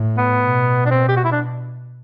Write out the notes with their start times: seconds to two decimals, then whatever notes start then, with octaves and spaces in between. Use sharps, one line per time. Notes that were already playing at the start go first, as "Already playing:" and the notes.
Already playing: A2
0.17 B3
0.42 B2
0.86 D4
0.91 C4
1.09 G4
1.17 F#4
1.25 E4
1.32 D4